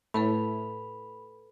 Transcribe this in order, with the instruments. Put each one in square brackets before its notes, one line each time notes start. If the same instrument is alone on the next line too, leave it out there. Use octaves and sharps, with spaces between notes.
[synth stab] A2 [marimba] A4 B4 A5 [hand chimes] B5